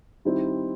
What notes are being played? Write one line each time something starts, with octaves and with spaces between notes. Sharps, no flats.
D#3 G3 C4 E4